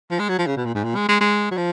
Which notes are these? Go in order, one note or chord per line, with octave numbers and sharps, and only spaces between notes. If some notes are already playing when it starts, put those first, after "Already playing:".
F3
G#3
F#3
F3
C#3
B2
A#2
G#2
A#2
G#3
G#3
G#3
F#3
F3